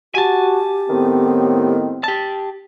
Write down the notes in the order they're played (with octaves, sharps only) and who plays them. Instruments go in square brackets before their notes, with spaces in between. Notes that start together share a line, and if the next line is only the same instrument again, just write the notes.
[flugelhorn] F#4 [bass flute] G4 [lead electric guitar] G#5 A5
[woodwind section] A2 D#3 B3 [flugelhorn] C4
[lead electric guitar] G4 A5